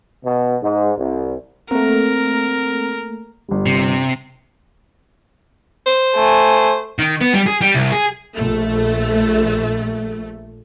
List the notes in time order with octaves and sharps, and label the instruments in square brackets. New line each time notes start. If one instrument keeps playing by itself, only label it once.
[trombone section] B2
G#2
C2
[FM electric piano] A3 A#3 [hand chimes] C4 A#5 [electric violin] A#4
[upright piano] G1 G3
[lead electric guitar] C3
[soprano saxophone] C5
[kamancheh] A3 G#5
[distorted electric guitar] D#3
B3
G3
G#4
G3
C2
G#4
[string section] A#1 A3